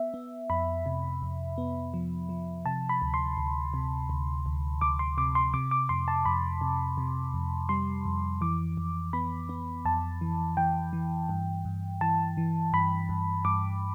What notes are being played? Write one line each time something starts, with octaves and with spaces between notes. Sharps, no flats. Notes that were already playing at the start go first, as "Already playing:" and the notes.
Already playing: B3 E5
B3
F2 B5
C3
F2
B3
F3
F3
C3 A5
B5
D2
C6
D2
C3
D2
D2
D2 D6
C6
C3 D6
C6
C3 D6
D6
F2 C6
A5
F2 B5
C3
C3
F2
G3 C6
F2
E3 D6
F2
B3 B5
B3
F2 A5
E3
E3 G5
E3
G2
G2
E3 A5
E3
G2 B5
G2
G2 D6